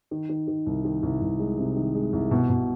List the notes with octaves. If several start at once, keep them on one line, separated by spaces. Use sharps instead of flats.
D#3
D#3
D#3
C2
D#3
C2
C2
G#3
C3
D#3
G#3
C2
B2
B2